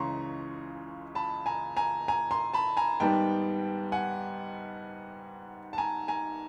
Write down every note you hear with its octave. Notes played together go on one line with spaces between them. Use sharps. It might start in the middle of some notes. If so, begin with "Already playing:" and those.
Already playing: C#2 C#3 E3 G#3 C#4 A#5 C6 C#6
A5 B5
G#5 A#5
G#5 A#5
G#5 A#5
A#5 C6
A5 B5
G#5 A#5
G#2 D#3 G3 B3 G5 A5
F#5 G#5
A5
G#5 A#5
G#5 A#5